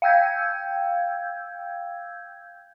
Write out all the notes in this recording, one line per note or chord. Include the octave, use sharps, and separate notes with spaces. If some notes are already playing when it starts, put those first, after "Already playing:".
F5 G5 E6 G6 G#6